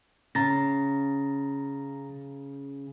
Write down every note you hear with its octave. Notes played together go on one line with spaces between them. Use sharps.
C#3 A#5 A6 A#6